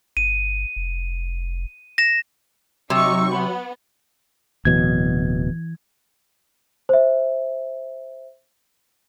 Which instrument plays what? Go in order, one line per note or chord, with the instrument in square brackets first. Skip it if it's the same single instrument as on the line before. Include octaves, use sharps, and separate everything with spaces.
[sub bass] G1 [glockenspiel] D#7
[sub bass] F1
[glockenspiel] A#6 E7
[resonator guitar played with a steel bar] C3 [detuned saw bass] F#3 [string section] D#4 C#6 [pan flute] E6
[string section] B3 [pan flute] B5
[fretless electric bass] D1 B2 F#3 [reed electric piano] E3 G#6
[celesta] C5 E5